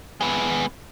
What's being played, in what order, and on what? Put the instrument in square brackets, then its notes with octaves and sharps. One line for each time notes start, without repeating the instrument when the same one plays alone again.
[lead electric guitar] G#3 B3